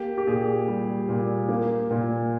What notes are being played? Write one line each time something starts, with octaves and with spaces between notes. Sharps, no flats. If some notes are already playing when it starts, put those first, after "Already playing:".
Already playing: A#3 G4
G4
A#2 G#4
G3
A#2
A#3
A#2